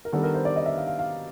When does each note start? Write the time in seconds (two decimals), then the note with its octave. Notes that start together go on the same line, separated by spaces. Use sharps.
0.05 A#4
0.12 D#3 G3 B3 D4 A4
0.23 A#4
0.34 C5
0.45 D5
0.56 D#5
0.66 E5
0.77 F5
0.87 F5
0.99 F5